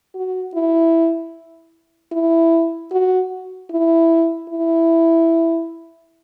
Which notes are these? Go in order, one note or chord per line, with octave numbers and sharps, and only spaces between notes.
F#4
E4
E4
F#4
E4
E4